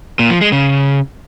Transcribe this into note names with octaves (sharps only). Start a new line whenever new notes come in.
A#2
F3
G#3
C#3